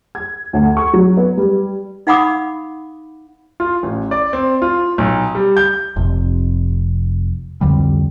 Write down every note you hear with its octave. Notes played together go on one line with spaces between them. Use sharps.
G#6
D2
C#6
F#3
B3
G3
D#4 F5 F#5 B5 D6 D#6
F4
A1
D5
C4
F4
B1
G3
G6
F1 F2 C3
C2 F2 D3 G3